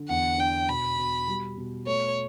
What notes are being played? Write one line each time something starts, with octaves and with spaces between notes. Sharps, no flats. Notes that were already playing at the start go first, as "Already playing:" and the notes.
Already playing: D3
E2 F#5
D4 G5
B2 B5
B2
G3
B2
A3 C#5